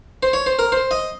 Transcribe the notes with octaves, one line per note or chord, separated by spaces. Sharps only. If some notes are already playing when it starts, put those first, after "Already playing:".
C5
C#5
C5
A#4
C5
D#5